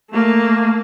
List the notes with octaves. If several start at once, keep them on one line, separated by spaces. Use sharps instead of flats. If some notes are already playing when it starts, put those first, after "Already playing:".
A3 A#3